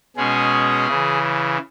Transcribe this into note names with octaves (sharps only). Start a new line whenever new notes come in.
B2 G#3 C#4 G#4
C#3 E3